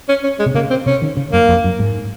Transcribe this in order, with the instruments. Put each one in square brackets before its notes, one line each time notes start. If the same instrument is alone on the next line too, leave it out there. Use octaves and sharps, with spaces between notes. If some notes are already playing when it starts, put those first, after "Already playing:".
[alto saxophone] C#4
C#4
G#3
[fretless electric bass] C3
[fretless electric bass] C#3 [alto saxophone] A#3
[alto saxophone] C4
[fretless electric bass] C3 [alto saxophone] C#4
[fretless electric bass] D#3
C#3
[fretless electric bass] F#2 [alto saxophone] A#3
[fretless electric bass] F2
F#2
G#2